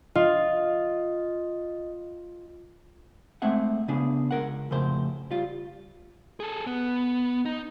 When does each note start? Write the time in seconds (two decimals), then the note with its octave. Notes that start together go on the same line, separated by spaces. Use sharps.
0.16 F4 D#5
3.42 G#3 A3 C4 E5 F#5
3.88 C#3 B3 D4 G#4
4.31 C#2 G#2 A#4 F#5
4.71 F2 A2 C#3 C5
5.31 G3 F4
6.40 G#4 A4
6.67 B3
7.45 D#4